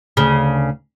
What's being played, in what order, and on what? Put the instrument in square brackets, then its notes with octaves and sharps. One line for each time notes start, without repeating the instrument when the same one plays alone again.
[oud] D2 C#3